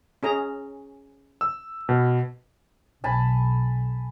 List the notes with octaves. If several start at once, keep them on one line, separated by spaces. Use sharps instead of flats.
C#4 G#4 A#5
E6
B2
B1 G#5 A5 B5